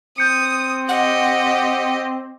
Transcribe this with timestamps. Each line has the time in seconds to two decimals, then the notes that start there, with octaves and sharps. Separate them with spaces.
0.18 C4 D#6 G6 C#7
0.89 G4 D#5 F#5